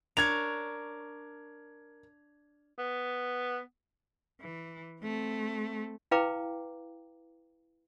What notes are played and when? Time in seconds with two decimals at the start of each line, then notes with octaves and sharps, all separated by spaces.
0.17 D4 A#4 C#5 G#6 F7
2.79 B3
4.41 E3
5.02 A3 C4
6.11 E4 B4 F5 G5 A#5 D6